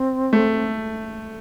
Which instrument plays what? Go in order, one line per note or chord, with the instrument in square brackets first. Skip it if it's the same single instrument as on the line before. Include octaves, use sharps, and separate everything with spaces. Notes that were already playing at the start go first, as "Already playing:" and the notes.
Already playing: [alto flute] C4
[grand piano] A3